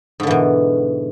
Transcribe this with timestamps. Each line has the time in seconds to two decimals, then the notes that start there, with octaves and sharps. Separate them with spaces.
0.20 G#2
0.23 D3
0.27 E3
0.31 B2